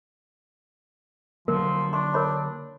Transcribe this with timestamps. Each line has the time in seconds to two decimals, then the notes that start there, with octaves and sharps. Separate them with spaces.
1.48 D3 F3 F#3 A#3 A#4
1.93 D4 C6 C#6
2.14 A#4 C#5 B5